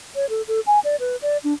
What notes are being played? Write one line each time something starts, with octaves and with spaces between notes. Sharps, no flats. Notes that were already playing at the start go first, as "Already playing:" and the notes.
C#5
A4
A4
G#5
D5
B4
D5
D4